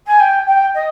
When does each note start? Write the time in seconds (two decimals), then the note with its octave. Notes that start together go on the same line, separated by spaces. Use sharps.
0.06 G#5
0.20 G5
0.47 G5
0.74 D#5